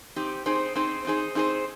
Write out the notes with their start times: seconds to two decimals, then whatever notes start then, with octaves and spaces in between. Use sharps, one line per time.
0.16 C4 D#4 G4
0.46 C4 D#4 G#4 C5
0.75 C4 D#4 G#4 C5
1.05 C4 D#4 G#4 C5
1.35 C4 D#4 G#4 C5